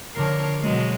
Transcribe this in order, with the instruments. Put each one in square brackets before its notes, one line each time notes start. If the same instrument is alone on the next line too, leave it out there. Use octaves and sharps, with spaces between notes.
[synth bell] D3 F3 C7 [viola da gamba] A#4 C#5
[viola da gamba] B2 F#3 G#3